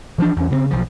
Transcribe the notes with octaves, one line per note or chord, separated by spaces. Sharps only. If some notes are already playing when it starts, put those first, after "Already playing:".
E3 F3 D4
E2 C#4
C#3 B3 C4
B1 F3